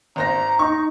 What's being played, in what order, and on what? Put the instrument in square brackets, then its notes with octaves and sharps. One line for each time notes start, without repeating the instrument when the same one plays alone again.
[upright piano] G#1 C5 A#6 [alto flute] A#5
[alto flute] D#4 [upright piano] C#6